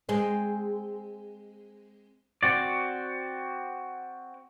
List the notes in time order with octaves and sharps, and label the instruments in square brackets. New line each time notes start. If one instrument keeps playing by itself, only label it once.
[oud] G#3 C4
[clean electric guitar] C4 F#4 D5